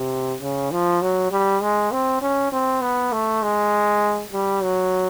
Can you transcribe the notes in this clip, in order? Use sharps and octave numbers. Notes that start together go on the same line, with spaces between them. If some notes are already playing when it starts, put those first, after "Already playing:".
Already playing: C3
C#3
F3
F#3
G3
G#3
C4
C#4
C4
B3
A3
G#3
G3
F#3